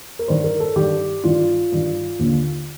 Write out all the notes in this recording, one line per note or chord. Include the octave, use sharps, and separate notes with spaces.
A#4
G2 D#3 C5
A#4
A4
G2 D#3 G4
G2 D#3 F4
G2 D#3
D#2 D3